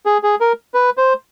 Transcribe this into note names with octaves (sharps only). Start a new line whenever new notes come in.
G#4
G#4
A#4
B4
C5